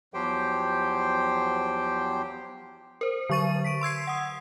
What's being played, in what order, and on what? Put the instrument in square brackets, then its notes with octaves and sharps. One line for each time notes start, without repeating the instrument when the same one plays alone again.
[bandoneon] E2 F3 F#3 G4 C5 G5
[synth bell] A#4 C5
D3 F#3 C#6 A6 D#7
B6 D7
C6 E6 G#6 C7
F#5 D#6